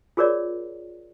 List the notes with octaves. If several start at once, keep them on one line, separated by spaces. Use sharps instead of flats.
F4 G#4 A#4 C#5 D5